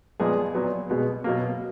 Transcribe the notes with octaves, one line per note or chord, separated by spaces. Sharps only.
A#2 F3 G#3 B3 G#4
A#2 F#3 B3
B2 G#3 B3
B2 F#3 A#3